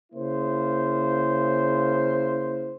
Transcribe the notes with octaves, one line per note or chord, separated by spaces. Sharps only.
C#3 A#3 E4 C5